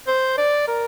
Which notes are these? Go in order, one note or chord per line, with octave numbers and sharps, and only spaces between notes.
C5
D5
A#4